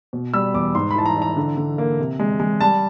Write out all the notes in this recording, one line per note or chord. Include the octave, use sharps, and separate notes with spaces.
B2
G3 E6
E2 D6
G#2 C6
B5
E3 A5
A#5
E3
A#5
D3
D3
A#3
C3
G#3
G#3
G3 A5